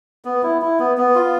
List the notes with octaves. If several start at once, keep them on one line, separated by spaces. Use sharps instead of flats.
B3
E4
E4
B3
B3
F4